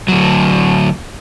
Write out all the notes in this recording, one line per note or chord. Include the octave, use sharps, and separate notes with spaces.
D2 F#3